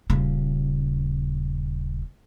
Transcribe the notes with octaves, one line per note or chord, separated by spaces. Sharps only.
D#1 C#3